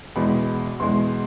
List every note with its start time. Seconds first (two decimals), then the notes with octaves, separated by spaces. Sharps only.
0.16 E2 B2 G#3 B5
0.80 E2 B2 G#3 C6